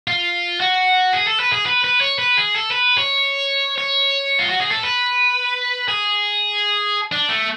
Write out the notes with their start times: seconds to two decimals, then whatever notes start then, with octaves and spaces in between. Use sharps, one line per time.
0.08 F4
0.60 F#4
1.13 G#4
1.27 A4
1.40 B4
1.52 G#4
1.66 B4
1.84 B4
2.01 C#5
2.19 B4
2.37 G#4
2.55 A4
2.71 B4
2.98 C#5
3.78 C#5
4.39 F4
4.50 F#4
4.61 G#4
4.71 A4
4.83 B4
5.88 G#4
7.12 D4
7.29 A3